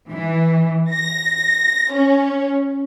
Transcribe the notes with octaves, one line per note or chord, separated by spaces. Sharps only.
E3
A#6
C#4